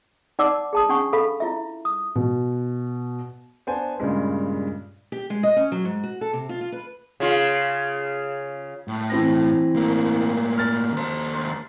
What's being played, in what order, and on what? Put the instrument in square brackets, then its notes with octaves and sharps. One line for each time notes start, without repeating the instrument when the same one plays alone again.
[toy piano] D#4 D5 F#5 A5 D6 E6
G#4 A5 D#6
C#4 D4 F#5 G#5 C#6
A4 F5 B5
E4 F4 E5
D#6
[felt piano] B2
[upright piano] B3 D4 C5 G#5 A5
G2 A#2 C#3 G#3
[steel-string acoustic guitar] G4
G#3
D#5
C#4
F#3
G#2
F#4
A4
C3
F4
F4
B4
[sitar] C#3 F4
[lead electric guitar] A2
[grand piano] E3 C4 A#6
[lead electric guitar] A2 A#3
[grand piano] F6 A6
[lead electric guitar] D#2 C5